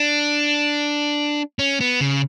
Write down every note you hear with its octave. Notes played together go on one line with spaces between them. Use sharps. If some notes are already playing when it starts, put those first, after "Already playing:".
Already playing: D4
C#4
B3
C#3